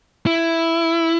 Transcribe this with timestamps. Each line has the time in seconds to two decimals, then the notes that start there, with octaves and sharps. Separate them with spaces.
0.27 E4